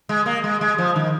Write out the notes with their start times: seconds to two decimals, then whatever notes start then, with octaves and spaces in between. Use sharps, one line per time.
0.09 G#3
0.26 A#3
0.44 G#3
0.61 G#3
0.78 F3
0.96 D#3